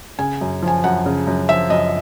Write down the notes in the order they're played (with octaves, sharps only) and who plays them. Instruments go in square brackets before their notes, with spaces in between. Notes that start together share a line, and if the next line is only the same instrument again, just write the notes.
[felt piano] C#3 G#5
F#2
F3
G#5
F#2 F#5
C#3
F#2
F3 E5
F#2 D#5